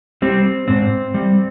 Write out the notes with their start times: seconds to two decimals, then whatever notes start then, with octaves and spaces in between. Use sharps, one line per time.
0.22 G3 C4
0.68 G#2 C4
1.14 G3